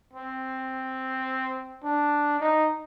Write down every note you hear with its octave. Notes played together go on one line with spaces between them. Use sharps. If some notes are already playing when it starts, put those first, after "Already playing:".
C4
D4
D#4